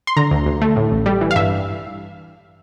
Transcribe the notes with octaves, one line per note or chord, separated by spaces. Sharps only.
C6
D3 A#5
D2
D2
A3
A2
A1
G3
E3
F5
G2 E5